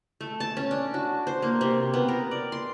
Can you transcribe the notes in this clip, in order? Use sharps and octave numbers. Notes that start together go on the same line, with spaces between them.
A3
A5
C#4
D4
F#4
C5
A#3
C3
B3
A#4
D5
C6